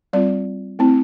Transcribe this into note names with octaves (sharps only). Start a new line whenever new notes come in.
G3 C4 F4 D5
A3 C4 E4